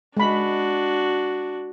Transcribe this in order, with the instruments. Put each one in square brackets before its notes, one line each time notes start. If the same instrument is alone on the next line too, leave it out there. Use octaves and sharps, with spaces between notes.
[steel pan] G#3 B5 [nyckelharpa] D4 F#4